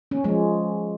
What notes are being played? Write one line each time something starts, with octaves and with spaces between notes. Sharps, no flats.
C#4
F3 G#3 C#4